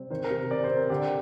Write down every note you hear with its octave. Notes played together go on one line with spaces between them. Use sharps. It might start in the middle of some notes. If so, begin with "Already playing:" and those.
Already playing: C3 G3 C4
D#3 C5
A#4
C3
C4 D5
C5
C4
A#4
D3 G4